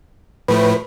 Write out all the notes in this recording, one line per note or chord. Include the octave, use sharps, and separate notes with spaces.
A2 F3 A3 B4